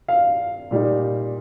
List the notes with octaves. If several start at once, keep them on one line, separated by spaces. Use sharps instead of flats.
F5
A#2 G3 D#4